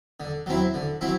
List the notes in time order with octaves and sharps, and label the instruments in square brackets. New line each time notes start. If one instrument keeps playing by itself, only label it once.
[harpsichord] D3
F#3 C4 E4
D3
F#3 C4 E4